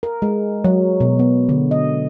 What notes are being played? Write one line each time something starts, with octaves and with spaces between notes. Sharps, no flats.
A#4
G#3
F#3
B2
B3
D3
D#5